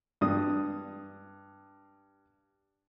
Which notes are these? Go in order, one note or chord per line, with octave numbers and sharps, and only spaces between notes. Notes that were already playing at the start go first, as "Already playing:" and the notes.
G2 D#6